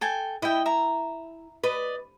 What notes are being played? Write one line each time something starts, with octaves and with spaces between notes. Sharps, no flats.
A4 G5 G#5
E4 D#5 G5
E5 A#5
B4 D5 D#5